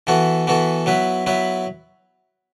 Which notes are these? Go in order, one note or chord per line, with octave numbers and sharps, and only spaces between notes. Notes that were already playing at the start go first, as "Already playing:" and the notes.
E3 B3 F#4 A4
E3 B3 F#4 A4
F#3 B3 E4 B4
F#3 B3 E4 B4